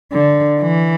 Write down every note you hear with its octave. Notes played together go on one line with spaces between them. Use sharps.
D3
E3